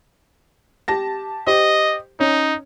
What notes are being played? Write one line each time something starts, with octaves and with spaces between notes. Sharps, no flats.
G4 A5 A#6
G4 C5 D#5
C#4 D#4 C#5